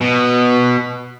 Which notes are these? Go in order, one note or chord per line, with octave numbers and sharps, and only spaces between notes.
B2